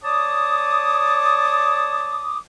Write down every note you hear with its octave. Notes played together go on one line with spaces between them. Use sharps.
C#5 D5 A5 D6 D#6